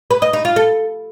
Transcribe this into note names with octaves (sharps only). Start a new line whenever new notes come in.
B4
D#5
D#4
F4
A4